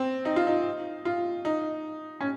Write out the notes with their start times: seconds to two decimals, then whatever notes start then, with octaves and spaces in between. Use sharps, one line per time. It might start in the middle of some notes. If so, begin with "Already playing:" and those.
Already playing: C4
0.25 D#4
0.36 F4
0.47 D#4
1.05 F4
1.45 D#4
2.21 C#4